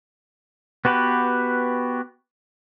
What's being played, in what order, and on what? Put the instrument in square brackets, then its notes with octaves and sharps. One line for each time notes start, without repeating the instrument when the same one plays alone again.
[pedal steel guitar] B3 F#4 G4 B4